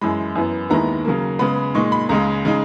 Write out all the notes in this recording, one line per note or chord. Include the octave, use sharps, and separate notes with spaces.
F#2 E3 G#3 B5
F#2 E3 B3 E4
D#2 D#3 G#3 B3 E4 A#5
C#3 F#3 A#3
C#3 G#3 B3 B5
A#2 G#3 D#4 C#6
B5
C#2 C#3 G#3 A#5
C#3 G#3 D#4